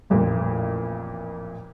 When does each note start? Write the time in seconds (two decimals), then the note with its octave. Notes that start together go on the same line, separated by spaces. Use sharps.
0.10 A1 F2 A#2